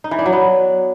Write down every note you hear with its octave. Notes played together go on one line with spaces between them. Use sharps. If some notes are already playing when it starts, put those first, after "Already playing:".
D#4
E3
D4
F#3
B3